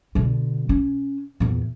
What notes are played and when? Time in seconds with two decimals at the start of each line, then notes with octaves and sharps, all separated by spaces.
0.15 B2 D3
0.69 C#4
1.40 E2 A#2